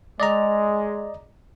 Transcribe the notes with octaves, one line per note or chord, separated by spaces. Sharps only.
G#3 D5 D#5 A#5